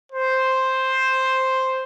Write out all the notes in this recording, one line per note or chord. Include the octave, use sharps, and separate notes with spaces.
C5